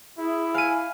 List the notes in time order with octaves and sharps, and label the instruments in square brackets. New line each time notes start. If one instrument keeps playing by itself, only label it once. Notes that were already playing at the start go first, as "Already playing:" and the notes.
[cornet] E4 [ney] G#4
[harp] F5 D#7 [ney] G#5